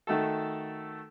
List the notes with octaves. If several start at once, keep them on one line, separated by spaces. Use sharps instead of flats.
D#3 A3 F#4 A4